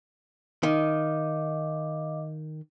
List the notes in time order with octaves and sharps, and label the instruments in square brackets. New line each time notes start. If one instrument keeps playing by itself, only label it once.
[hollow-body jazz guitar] D#3 [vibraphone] D#5 F5 D6